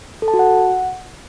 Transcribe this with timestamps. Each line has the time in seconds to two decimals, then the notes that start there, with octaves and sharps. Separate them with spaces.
0.22 A4
0.28 A5
0.34 F#4
0.39 F#5